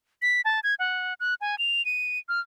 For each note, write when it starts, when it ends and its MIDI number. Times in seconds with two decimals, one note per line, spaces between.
0.22 0.41 95
0.45 0.60 81
0.64 0.75 92
0.79 1.14 78
1.20 1.34 90
1.41 1.58 80
1.58 1.84 101
1.85 2.19 99
2.29 2.40 89